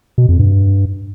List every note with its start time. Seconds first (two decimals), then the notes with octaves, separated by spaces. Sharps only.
0.18 B2
0.29 F2
0.39 G2